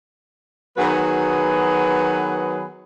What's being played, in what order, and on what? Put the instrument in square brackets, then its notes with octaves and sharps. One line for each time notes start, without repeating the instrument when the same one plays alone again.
[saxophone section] D#3 F#3 B3 F#4 G#4 B4